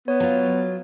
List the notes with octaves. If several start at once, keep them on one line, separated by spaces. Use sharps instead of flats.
B3 C#5
F#3 F4